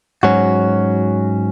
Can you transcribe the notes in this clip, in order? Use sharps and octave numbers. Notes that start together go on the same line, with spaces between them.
G#2 F#3 C#4 F#4